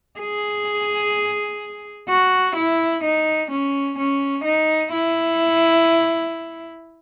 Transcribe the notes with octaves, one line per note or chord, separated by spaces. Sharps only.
G#4
F#4
E4
D#4
C#4
C#4
D#4
E4